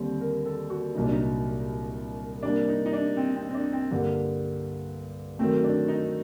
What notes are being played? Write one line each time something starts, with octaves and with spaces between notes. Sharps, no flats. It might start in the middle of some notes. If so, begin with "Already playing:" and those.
Already playing: D#2 D3 G3 C4
A#4
A4
F#4
C2 A#2 F#3 D#4
D4
D#4
C3 G3 A#3 D4
D#4
D#4
D4
C4
C4
C4
D4
C4
G2 D3 G3 A#3
D#3 F#3 A3 C4
D4
D#4